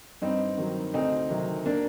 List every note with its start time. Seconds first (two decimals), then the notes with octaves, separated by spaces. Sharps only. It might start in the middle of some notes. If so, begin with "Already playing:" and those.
0.22 G2 C4 D#4
0.57 D#3 F#3
0.94 D2 C4 D#4
1.30 C3 D#3 F#3
1.66 A#3 D4